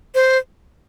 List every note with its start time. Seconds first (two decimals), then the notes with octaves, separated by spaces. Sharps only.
0.15 C5